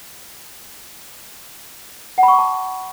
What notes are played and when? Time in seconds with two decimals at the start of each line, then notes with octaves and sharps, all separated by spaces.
2.18 F#5
2.23 B5
2.28 C#6
2.33 D6
2.38 A5